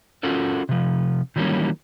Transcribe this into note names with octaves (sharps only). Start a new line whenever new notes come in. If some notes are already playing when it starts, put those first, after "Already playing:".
C#4 F4 F#4 A4 A#4
C3 F3
D#3 E3 F#3 G3 A#3 C#4